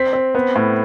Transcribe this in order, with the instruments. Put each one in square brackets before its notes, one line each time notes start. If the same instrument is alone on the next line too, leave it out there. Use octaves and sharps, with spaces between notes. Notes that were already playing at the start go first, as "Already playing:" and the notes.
Already playing: [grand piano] C4 B6
C4
B3
A2